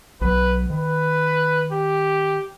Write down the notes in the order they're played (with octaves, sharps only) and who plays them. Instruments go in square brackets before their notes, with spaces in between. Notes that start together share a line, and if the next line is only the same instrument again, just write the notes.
[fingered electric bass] B1 F#3 [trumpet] B4
[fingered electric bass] D#3 [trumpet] B4
[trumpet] G4